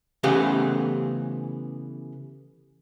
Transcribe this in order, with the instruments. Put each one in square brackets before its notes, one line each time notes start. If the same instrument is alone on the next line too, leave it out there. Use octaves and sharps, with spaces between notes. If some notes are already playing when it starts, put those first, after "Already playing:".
[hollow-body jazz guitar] C#3 E3 A3 B3 G4 G#4